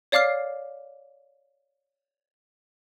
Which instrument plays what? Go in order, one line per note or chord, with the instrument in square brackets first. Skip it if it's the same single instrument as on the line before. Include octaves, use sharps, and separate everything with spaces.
[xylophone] C#5 D5 F5 D6 F6 C7